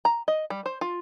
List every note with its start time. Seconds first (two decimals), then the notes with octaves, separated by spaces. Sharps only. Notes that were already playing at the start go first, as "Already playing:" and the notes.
0.05 A#5
0.28 D#5
0.50 G3
0.66 C5
0.81 F4